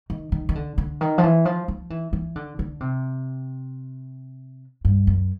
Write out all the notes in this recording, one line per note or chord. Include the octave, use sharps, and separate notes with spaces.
D#3
D#3
D#3
D3
D3
D#3
F3
E3
F3
F3
E3
E3
D3
D3
C3
G2
F#2